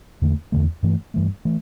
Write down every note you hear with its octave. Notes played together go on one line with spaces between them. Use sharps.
E2 D3 A3
E2 D3 A3
G2 E3 A3
G2 E3 A3
E3 A3